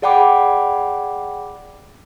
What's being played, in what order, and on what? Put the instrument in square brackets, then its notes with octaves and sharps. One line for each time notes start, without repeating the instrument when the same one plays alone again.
[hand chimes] G#4 D5 F#5 G5 B5 D6